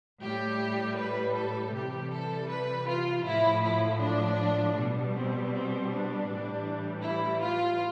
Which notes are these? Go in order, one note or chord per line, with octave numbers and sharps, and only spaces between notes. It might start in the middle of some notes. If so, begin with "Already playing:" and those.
A2 G3 G4
B4
A4
C3 E3 G3 G4
A4
B4
F4
A2 F3 E4
E4
D4
B2 G3
C4
C4
D4
A2 E3 G3
E4
F4